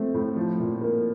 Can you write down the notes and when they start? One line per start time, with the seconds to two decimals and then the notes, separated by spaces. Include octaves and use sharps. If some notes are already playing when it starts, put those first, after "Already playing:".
Already playing: F3 A3 C4
0.14 A2
0.36 F3
0.59 A#2
0.81 A#3